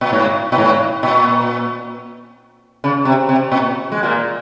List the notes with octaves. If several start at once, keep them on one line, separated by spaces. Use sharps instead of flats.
A#2
G#2
A#2
G#2
A#2
C#3
C3
C3
A#2
G#3
A#2 A#3